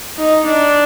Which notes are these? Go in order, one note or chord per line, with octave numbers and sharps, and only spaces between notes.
D#4
D4